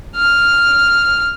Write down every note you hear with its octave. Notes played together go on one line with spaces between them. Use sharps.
F6